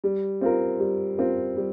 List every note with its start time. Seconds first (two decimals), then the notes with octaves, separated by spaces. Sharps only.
0.04 G3
0.41 C4 F4 A#4
0.79 G3
1.18 C4 F4 A#4
1.57 G3